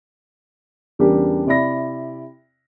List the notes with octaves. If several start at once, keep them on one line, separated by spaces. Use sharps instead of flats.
E2 C#3 G3 D4 G4 A#4
C3 E4 D5 E5 B5 A#6